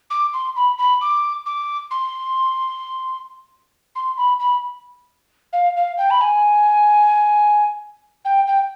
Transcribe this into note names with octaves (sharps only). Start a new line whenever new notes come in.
D6
C6
B5
B5
D6
D6
C6
C6
B5
B5
F5
F5
G5
B5
G#5
G5
G5